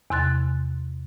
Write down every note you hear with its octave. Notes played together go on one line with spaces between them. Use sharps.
E2 C3 C6 F#6 A6